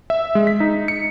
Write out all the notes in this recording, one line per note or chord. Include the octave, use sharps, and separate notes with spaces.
E5
G#3
B6
D#4
C#7